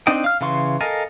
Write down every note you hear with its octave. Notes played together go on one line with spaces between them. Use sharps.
C4 D4 D#4 D#5 G5
F5 F6
C#3 E3 F5 C6 C#6
A4 A#4 D#5 F5 G#5